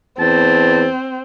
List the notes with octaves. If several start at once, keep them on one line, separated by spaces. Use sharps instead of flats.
E2 C4 A5